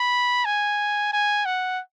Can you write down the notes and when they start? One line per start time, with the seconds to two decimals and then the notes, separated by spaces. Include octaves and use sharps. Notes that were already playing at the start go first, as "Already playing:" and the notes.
Already playing: B5
0.45 G#5
1.13 G#5
1.46 F#5